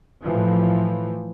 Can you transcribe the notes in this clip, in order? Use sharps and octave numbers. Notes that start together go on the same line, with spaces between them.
A2 E3 F3